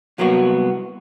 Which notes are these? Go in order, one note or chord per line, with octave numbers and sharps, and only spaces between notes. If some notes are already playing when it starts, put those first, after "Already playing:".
C2 F#3 A#3 B3 F#4